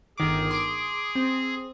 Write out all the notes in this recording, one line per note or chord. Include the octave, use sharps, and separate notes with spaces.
G1 D#3 G#4 D6
C6 D6 D7
C4